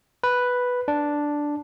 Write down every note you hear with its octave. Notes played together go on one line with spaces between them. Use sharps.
B4
D4